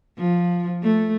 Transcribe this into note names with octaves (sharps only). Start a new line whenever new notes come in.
F3
A3